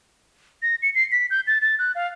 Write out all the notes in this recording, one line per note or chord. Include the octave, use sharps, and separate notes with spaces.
A#6
C#7
C7
B6
G6
A6
A6
F#6
F5